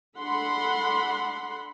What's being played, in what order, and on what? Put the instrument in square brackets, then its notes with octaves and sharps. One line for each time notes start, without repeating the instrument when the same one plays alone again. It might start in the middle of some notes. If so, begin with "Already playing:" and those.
[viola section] D4 A4 F#5 B5 C6